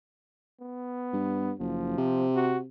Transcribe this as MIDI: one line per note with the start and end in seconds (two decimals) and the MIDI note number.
0.60 1.52 59
1.13 1.53 43
1.59 1.95 30
1.59 2.27 53
1.97 2.68 48
2.35 2.58 66